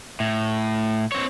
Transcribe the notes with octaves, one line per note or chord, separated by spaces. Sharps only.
A2
C4 C#5